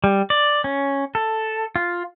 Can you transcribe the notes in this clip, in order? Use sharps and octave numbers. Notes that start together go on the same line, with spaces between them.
G3
D5
C#4
A4
F4